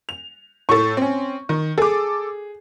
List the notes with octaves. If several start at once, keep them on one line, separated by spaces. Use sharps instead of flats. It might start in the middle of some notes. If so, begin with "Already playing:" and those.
F7
A2 A4 C#6
C4 C#4
D#3
G#4 A4 D6